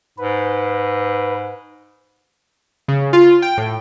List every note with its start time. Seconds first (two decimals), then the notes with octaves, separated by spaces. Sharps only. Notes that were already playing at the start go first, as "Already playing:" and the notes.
0.18 G#2 B4
2.88 C#3
3.13 F4
3.42 G5
3.57 A2